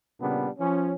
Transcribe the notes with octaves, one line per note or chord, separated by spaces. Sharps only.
A#2 C#3 G3 B3 D4
F3 C#4